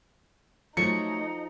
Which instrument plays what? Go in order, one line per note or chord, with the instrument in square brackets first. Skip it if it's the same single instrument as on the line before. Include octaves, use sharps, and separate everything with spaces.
[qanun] F3 A4 C#6 [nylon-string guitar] F#3 A3 [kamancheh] D#4 [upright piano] C#7